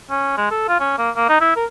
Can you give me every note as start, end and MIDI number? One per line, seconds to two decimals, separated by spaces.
0.10 0.34 61
0.37 0.50 56
0.51 0.67 69
0.68 0.78 65
0.80 0.94 61
0.98 1.10 58
1.16 1.28 58
1.29 1.38 63
1.41 1.54 64
1.56 1.65 70